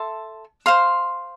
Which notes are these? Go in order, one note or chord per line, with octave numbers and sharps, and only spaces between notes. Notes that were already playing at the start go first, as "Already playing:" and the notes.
Already playing: A4 E5 A5 C6
C5 F5 C6